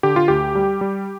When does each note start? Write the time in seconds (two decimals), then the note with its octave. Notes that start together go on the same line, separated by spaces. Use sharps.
0.03 D3 G4
0.16 F4
0.28 D2 G4
0.55 G3
0.81 G3